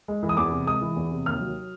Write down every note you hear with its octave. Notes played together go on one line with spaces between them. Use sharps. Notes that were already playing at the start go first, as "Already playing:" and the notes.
G#3
E3
D#6
E2 D6
C3
G#3 D#6
E3
E2
C3
D#2 F6
F#3